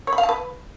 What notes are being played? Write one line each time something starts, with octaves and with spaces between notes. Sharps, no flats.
C#5
B5
F5
A5
B4